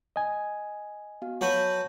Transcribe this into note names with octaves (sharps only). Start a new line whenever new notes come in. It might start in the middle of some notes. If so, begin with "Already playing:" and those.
D#5 G#5
B3 F#4 F5
F#3 F#4 B4 F#5 A5 G6